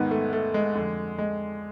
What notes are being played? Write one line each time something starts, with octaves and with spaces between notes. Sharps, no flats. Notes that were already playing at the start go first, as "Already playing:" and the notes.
Already playing: G#2 D#3 B3
A3
A3
G#3
F2 D3
G#3